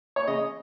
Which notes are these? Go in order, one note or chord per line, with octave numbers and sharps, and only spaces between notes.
C#5
C#3 D#5